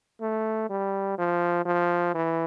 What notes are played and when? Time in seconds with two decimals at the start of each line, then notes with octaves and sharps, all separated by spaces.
0.21 A3
0.70 G3
1.18 F3
1.66 F3
2.15 E3